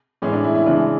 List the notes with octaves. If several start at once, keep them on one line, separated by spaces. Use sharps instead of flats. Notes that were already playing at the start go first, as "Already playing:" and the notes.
A2 E3 G#3 C#4
D4
E4
E4
C#3 E3 G#3 D4